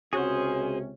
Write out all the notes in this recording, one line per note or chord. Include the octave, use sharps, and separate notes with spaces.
C#2 C3 C#4 F#4 G#4 C5